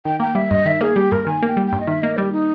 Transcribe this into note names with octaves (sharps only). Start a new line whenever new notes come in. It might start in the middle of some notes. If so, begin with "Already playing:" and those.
D#3 G5
A#3 G5
G3 E5
G2 D#5
D#3 E5
A#3 G#4
G3 G4
G2 A#4
D#3 G#5
A#3 G5
G3
G5
G2
D#5
D#3 E5
A#3 D#5
G3 G4
D#4